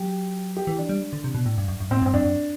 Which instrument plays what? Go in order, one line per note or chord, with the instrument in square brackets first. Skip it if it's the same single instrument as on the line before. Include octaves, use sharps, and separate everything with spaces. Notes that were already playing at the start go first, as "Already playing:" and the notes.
Already playing: [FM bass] F#3 [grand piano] G4
[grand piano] G4
[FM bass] E3
[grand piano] D4
[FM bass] G3
D3
C3
B2
A2
G2
F#2
F#2
[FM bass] A2 [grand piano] C4
[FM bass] G2 [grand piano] C4
[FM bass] F#2 [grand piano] D4
[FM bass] F#2